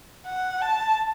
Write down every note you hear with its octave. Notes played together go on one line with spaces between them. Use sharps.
F#5
A5